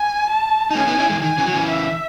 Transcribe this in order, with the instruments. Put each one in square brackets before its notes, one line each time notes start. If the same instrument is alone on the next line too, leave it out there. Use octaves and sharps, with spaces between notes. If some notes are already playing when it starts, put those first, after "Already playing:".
Already playing: [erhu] G#5
A5
[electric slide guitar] D#4
[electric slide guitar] A3 C#4 [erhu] G#5
[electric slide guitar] B3 D#4
C#4 E4
E3 G#3
[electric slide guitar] D#3 [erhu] G#5
[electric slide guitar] C#3 E3
F#3
C#3 E3
[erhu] E5